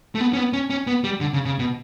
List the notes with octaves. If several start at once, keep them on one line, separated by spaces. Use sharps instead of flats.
A3
B3
C#4
B3
C#4
C#4
B3
G3
D3
C#3
C#3
B2